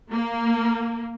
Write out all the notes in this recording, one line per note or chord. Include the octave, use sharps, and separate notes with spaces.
A#3